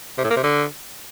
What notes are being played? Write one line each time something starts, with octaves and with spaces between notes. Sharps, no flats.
C3
A2
A#3
C3
D3